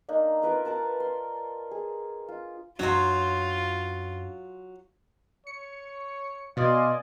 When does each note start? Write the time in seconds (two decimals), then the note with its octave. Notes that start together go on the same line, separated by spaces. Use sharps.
0.09 A#3 D4 D#4
0.42 F4 A#4 B4 D6
0.65 A#4 B4 A5 A#5
1.00 C6
1.71 G#4
2.28 F4
2.79 F#2 F#3 D4 F4 C#5 A#5 C6
5.47 C#5 C#7
6.57 B2 D5 D#5 F5 G#5 C6